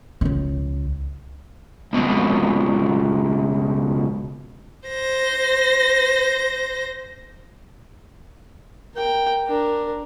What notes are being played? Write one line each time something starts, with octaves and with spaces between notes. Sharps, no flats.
C#2 C#3
C#2 B2
C5 A#6
A#4 G5
D4 A#4